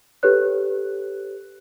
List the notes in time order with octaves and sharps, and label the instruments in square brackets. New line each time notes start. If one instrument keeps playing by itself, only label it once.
[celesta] G4 A4 B4 C#5 F#6